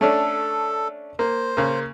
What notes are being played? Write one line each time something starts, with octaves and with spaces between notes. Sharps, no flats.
A3 C#4 D4 A4
A#3 C5
C#3 A#3